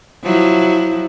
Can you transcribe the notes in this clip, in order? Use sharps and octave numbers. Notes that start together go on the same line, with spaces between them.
F3 F#3 E4